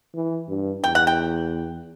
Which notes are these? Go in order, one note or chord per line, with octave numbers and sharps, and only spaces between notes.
E3
G2
E2 G5
F#5
G5